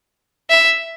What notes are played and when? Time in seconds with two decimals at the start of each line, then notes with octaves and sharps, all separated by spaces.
0.50 E5